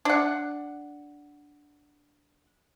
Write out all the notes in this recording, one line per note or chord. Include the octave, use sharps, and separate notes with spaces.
D4 F#5